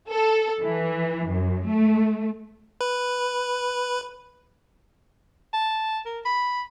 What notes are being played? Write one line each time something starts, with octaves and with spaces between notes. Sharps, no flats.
A4
E3
F#2
A3
B4
A5
A#4
B5